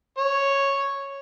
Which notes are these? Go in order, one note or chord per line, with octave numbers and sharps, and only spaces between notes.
C#5